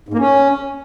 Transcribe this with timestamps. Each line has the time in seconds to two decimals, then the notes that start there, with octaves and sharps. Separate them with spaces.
0.09 G#2
0.14 A#3
0.19 C#4